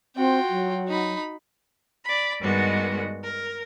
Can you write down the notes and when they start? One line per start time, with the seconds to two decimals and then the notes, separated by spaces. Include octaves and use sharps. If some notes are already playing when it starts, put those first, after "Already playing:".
0.16 C4 F4 F#4 G5
0.50 F#3
0.89 D#4 B5
2.04 D5 B5
2.41 G2 D#3 G3 G#3 B3 F#4
3.25 A#4